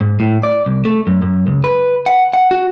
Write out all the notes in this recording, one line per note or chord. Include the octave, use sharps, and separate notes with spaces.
G#2
A2
D5
C2
A3
F#2
F#2
C#2
B4
F#5
F#5
F#4